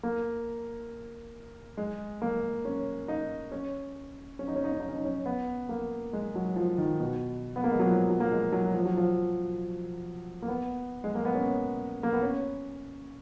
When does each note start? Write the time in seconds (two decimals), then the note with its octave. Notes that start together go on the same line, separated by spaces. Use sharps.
0.03 A#3
1.77 G#3
2.22 A#3
2.65 C#4
3.08 D#4
3.51 C#4
4.39 C#4
4.48 D#4
4.56 C#4
4.64 D#4
4.72 C#4
4.80 D#4
4.89 C#4
4.96 D#4
5.05 C#4
5.26 B3
5.69 A#3
6.13 G#3
6.35 F#3
6.56 F3
6.78 D#3
7.00 B2
7.56 B3
7.64 A#3
7.71 G#3
7.80 F#3
7.87 F3
8.10 F#3
8.20 A#3
8.31 G#3
8.52 F#3
8.74 F3
8.85 F#3
8.97 F3
10.42 A#3
10.48 B3
11.04 G#3
11.15 A#3
11.25 B3
11.35 C#4
12.03 A#3
12.13 B3
12.22 C#4